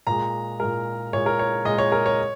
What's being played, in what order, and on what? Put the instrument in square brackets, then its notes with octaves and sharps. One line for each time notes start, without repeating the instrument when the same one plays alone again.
[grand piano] A#2 G#3 A#5
A#2 G#3 A#4
A#2 G#3 C#5
A#4
C#5
A#2 G#3 D#5
C#5
A#4
C#5